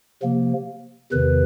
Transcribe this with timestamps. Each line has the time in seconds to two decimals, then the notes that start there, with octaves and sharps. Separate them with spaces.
0.22 C3 F3 A#3
1.12 E2 C3 D#3 B4